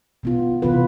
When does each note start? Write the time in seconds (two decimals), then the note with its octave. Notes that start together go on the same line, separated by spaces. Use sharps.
0.23 B2 B3 F4
0.62 C3 E3 B3 F4 B4